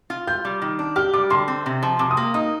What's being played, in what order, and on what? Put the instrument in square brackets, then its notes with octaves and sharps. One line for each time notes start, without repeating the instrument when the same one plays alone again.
[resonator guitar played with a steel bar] F4
[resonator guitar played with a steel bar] F4 [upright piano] G6
[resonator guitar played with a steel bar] G3
D#3
D4
[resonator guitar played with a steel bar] G4 [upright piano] F6
[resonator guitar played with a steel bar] G3 [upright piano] D6
[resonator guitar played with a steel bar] D3 [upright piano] C6
[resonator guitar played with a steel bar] C4
C3
F3
[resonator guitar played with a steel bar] C3 [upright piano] D6
[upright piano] D#6
[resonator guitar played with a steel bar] A#3
[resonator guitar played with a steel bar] D#4 [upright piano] D#6